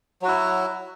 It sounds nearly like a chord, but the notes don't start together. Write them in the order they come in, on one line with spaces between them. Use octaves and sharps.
F#3 F#4 E4